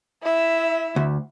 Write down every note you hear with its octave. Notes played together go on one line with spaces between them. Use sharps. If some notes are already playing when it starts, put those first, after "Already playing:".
E4 E5
D2